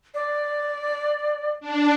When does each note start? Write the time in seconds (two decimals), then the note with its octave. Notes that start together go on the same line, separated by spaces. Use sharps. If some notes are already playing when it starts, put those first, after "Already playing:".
0.14 D5
1.60 D4